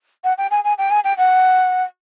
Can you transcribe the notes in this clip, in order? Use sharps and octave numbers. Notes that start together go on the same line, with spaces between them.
F#5
G5
G#5
G#5
G5
G#5
G5
F#5